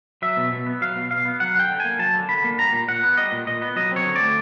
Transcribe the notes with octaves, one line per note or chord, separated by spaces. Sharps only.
F#3 E5
B2
B2
B3
F#3 F5
B2
B2 F5
B3
F#3 F#5
D3 G5
D3
A#3 G#5
F#3 A5
D3
D3 B5
A#3
G3 A#5
A#2
A#2 F#5
B3
G3 D#5
A#2
A#2 D#5
B3
F#3 D#5
C4 C#5
D3
D5
A3